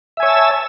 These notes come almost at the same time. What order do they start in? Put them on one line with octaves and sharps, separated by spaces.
E5 G#5 C#5 E6 A5